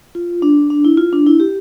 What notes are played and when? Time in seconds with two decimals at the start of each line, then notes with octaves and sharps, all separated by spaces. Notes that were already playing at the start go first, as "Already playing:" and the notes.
0.15 F4
0.42 D4
0.70 D4
0.85 E4
0.98 F4
1.13 D4
1.26 E4
1.40 G4